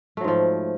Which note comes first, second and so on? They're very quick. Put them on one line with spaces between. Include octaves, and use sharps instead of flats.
A3 F#3 G#2 F3